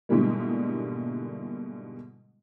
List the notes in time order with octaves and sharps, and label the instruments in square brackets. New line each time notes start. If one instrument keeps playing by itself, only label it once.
[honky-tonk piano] G#2 B2 D3 E3 G3 A#3